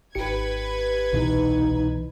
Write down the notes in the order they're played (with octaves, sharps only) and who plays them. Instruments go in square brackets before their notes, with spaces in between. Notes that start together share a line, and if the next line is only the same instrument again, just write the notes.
[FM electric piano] G#1 G4 C#7 [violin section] B4 G#6
[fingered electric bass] C2 B2 E3 [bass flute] D#4